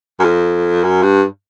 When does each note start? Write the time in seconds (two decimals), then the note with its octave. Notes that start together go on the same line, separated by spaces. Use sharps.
0.19 F#2
0.24 F2
0.84 F#2
1.03 G2